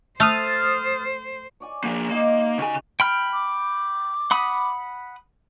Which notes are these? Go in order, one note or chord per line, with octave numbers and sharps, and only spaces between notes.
A3 C5 D#6 F6 A6
C#5 D5 G#5
F3 A#3
G#3 A#3 D#4 G4
C#3 F#4 G#5
G5 B5 F6
D6
F#5 B5 D#6